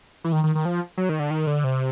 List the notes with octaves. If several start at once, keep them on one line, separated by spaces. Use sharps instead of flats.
E3
D#3
D#3
D#3
F3
F#3
D#3
D3
D#3
D3
C3